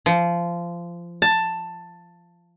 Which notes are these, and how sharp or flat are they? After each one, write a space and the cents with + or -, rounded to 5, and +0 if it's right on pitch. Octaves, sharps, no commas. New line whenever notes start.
F3 -20
A5 +10